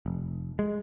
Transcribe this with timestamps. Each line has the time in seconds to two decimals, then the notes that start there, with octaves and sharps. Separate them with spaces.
0.06 F1
0.59 G#3